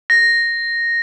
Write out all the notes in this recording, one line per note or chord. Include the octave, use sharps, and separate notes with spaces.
A#6